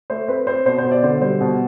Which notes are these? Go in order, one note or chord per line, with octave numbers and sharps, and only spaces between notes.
A3 C5
C4 B4
C4 C5
B2 C5
C5
B2
D5
D3 C5
G3 C5
B2